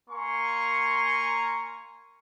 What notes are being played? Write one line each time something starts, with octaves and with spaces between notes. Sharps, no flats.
A#3 G#5 A#5 C6 C#6